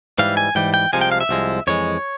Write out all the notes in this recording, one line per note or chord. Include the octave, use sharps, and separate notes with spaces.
G#2 E3 G3 F5
G#5
G#2 E3 G3 G5
G5
C2 C3 F3 G#3 G#5
G5
F5
E5
C2 C3 F3 G#3
F2 E3 G#3 C#5